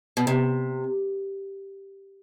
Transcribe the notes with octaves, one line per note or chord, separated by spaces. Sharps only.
B2
C3